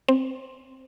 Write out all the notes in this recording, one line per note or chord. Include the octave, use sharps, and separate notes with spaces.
C4